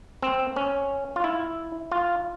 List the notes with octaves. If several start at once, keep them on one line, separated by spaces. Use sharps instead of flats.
C4
C#4
F4
E4
F4